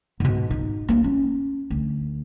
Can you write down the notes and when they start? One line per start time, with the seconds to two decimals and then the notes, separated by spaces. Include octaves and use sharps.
0.20 G#2 B2
0.50 D#4
0.89 A#3 D4
1.04 C#4
1.70 D2